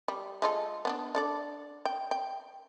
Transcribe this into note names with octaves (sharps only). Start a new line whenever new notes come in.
G3
G#3 F4 A4
B3 C#4 D4
D4 A4 D5
G5
G5